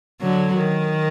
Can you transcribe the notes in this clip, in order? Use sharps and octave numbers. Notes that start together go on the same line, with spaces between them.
D3 F#3
D#3